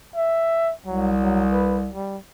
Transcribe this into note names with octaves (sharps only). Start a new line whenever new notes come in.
E5
C2 F#3
F#3
B4
G3